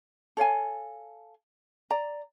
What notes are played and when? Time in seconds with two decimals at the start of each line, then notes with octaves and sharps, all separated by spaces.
0.37 A4 C#5 F5 G#5
1.90 D5 A#5